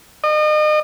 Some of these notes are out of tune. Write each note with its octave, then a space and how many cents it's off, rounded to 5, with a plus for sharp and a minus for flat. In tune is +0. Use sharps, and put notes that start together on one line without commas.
D#5 -35